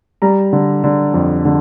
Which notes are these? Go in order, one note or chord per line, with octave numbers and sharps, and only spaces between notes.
G3 A#5
D3
D3
F2
D3